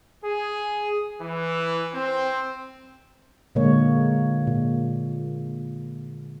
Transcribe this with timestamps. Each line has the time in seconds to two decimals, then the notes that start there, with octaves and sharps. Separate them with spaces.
0.25 G#4
1.21 E3
1.94 C4
3.55 A#2 D3 G#3 A#3 C#5
4.47 A#2